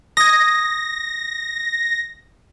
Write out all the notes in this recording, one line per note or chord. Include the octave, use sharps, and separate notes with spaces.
D#6 G#6 A#6